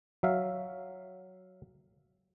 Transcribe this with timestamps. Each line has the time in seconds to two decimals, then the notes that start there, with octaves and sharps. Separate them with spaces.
0.23 F#3 E5 F5